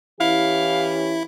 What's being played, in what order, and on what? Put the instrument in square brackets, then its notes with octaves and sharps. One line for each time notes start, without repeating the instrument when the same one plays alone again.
[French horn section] E3 C#4 G4 [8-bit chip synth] E4 [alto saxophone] F5